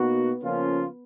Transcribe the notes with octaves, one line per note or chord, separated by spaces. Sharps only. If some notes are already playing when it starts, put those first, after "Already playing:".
Already playing: B2 A#3 B3 D#4 F#4
C#3 F3 A#3 C#4 F4